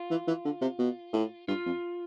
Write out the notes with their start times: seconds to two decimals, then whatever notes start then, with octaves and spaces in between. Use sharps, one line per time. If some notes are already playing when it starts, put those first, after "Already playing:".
Already playing: F4
0.11 E3
0.28 E3
0.45 D3
0.61 C3
0.79 B2
1.13 A2
1.48 G2 F4
1.66 F2